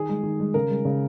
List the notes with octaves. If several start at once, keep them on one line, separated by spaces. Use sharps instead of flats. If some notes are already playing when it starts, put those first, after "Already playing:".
Already playing: D#3 G#4
G#3
D#3
G#3
C#3 A#4
G#3
C#3